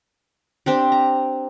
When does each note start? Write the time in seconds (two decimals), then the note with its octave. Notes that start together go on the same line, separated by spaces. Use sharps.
0.66 C4 D4 G4
0.92 A#5